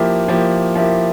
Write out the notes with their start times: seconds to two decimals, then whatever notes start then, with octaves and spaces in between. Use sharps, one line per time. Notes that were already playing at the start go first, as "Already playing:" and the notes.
Already playing: F3 A#3 E4 G4
0.28 F3 A#3 E4 G4
0.75 F3 A#3 E4 G4